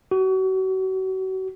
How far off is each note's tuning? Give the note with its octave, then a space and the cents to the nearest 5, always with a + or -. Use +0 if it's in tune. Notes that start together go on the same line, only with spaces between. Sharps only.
F#4 +35